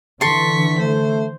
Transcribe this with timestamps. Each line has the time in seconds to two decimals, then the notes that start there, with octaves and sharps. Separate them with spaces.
0.21 D3 E3 A4 C6 C#6 B6
0.79 A3 C5